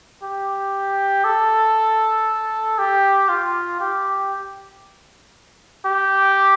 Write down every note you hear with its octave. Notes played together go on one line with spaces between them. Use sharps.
G4
A4
G4
F4
G4
G4